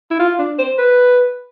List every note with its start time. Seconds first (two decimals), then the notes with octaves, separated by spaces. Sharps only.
0.11 E4
0.20 F4
0.39 D4
0.59 C5
0.78 B4